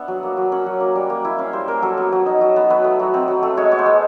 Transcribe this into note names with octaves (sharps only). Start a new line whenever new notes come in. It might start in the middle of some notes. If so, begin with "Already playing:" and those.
Already playing: B3 D4 E5 F#5
F#3
A#3
F#3
C#4 F#5
F#3
A#3
G3
A#3
E4
C#4 F5
G3 C5
A#3 A#4
F#3 A4
B3
F#3
D#4
F#3
B3
F#3 B4
A3
F#3
C4
F#3
A3
G#3 C#5
B3 C#5
C5
G#3